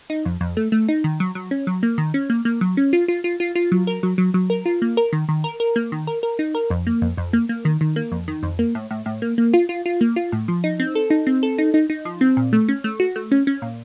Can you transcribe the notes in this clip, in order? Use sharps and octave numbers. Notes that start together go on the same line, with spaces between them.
D#4
F2
F2
A3
A3
D#4
D#3
F#3
F#3
C#4
F#3
A#3
D#3
C#4
A#3
A#3
F#3
C#4
F4
F4
F4
F4
F4
F#3
A#4
F#3
F#3
F#3
A#4
F4
A#3
A#4
D#3
D#3
A#4
A#4
A#3
D#3
A#4
A#4
D#4
A#4
F2
A#3
F2
F2
A#3
A#3
D#3
D#3
A#3
F2
D#3
F2
A#3
A2
A2
A2
A#3
A#3
F4
F4
F4
A#3
F4
A2
F3
D#4
C4
A4
D#4
C4
A4
D#4
D#4
D#4
F3
C4
A#2
A3
C#4
A3
F#4
A3
C#4
C#4
A#2